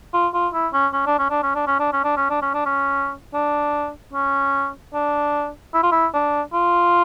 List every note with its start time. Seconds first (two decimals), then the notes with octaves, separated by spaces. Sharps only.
0.14 F4
0.34 F4
0.54 E4
0.73 C#4
0.93 C#4
1.07 D4
1.19 C#4
1.30 D4
1.43 C#4
1.55 D4
1.67 C#4
1.80 D4
1.93 C#4
2.04 D4
2.17 C#4
2.30 D4
2.42 C#4
2.54 D4
2.66 C#4
3.34 D4
4.14 C#4
4.94 D4
5.74 E4
5.83 F4
5.92 E4
6.14 D4
6.53 F4